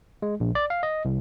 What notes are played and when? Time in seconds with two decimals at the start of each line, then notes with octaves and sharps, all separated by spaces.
0.22 G#3
0.40 A#1
0.55 D5
0.70 F5
0.83 D#5
1.05 C2